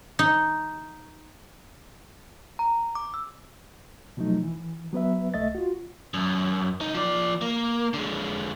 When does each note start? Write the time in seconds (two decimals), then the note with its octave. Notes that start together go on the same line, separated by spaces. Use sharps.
0.19 D#4
2.59 A#5
2.95 D6
3.14 E6
4.17 B2 F3 F#3 A3 D#4
4.43 E3
4.93 F#3 B3 B4 E5
5.34 C2 A3 D#5 E5 A6
5.55 F4 F#4
6.14 F#2
6.81 C#2 D#4
6.94 F3 D5
7.42 A#3
7.94 D3 G#3